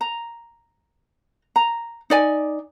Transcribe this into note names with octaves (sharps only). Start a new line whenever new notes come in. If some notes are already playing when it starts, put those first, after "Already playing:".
A#5
A#5
D#4 D5 G#5